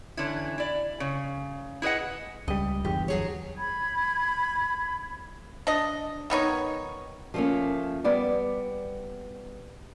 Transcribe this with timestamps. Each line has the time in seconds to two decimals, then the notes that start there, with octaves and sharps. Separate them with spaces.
0.17 D3 E3 C#4 E4
0.58 E4 D5
1.00 C#3
1.82 E4 G#4 B4 D#5 F#5
2.48 C#2 G3 D#5
2.85 G1 E2 G4
3.08 F#3 G#4 C#5
3.58 B5 G#6
5.67 D4 D#5
6.30 D#3 B3 D#4 C#5
7.34 F3 G3 A3 A#3 C#4
8.04 G3 B3 D5